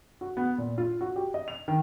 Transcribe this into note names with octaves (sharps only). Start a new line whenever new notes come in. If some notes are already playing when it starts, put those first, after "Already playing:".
F#4
B3
A#2
F4
F#4
G4
D#5
F7
D#3